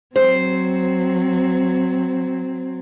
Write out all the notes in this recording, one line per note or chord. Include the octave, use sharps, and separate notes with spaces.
F#3 C4 C5